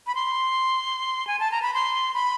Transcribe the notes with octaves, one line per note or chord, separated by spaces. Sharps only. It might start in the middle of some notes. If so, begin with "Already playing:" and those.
B5
C6
G#5
A5
A#5
B5
C6
B5